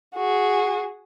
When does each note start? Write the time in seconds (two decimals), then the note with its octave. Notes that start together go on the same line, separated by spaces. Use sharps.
0.15 F#4 G#4